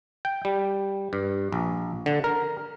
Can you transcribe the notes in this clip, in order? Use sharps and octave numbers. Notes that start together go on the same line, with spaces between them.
G5
G3
G2
A#1
D3
A#4